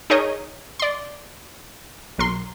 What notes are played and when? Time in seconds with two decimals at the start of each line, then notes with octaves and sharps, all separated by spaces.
0.10 D#4 G#4 A#4 C#5 D#5
0.80 D5 C6
2.18 B1 A#4 C6